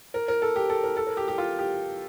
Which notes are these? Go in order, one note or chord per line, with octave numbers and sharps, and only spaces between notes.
A#4
A#4
A4
G4
A4
A#4
A4
A#4
G4
G4
F4
G4